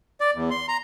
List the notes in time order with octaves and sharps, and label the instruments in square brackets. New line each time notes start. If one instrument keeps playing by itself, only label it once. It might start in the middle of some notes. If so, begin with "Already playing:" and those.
[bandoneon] D5
E2
C6
A#5